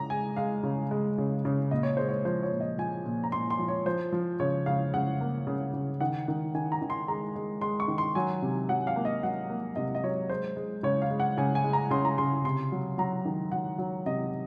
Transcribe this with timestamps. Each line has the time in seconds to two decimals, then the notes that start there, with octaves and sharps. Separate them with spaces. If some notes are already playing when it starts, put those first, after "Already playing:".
Already playing: C#3 G#3 A#5
0.10 G#3 G#5
0.36 G#3 F5
0.63 C#3
0.91 G#3
1.18 C#3
1.45 C#3
1.71 A#2 D#5
1.83 C#5
1.97 G#3 C5
2.09 C#5
2.25 F3 C5
2.43 C#5
2.51 A#2
2.60 D#5
2.78 F3 G#5
3.06 A#2
3.24 A#5
3.32 A#2 C6
3.50 C6
3.59 F3
3.68 C#5
3.86 F3 C5
4.12 F3
4.40 C#3 C#5
4.66 C#3 F5
4.94 C#3 F#5
5.21 A#3
5.47 C#3
5.73 C#3
6.00 D#3 F#5
6.28 D#3
6.54 D#3 G#5
6.72 A#5
6.82 D#3
6.90 C6
7.08 G#3 A#5
7.35 G#3
7.61 G#3 C6
7.80 C#6
7.88 D#3
7.98 C6
8.15 F#3 G#5
8.42 C3
8.69 F#3 F#5
8.87 F5
8.96 A#3
9.05 D#5
9.23 F#3 F#5
9.50 A#3
9.76 C3 D#5
9.95 D#5
10.04 F#3 C#5
10.29 G#3 C5
10.56 G#3
10.83 C#3 C#5
11.02 F5
11.10 G#3
11.20 F#5
11.37 C#3 G#5
11.55 G#5
11.64 G#3
11.73 A#5
11.91 C#3 C6
12.05 A#5
12.18 C#3 C6
12.44 C3 C6
12.72 F#3
12.98 F#3 A#5
13.25 D#3
13.52 F#3 F#5
13.78 F#3
14.06 C3 D#5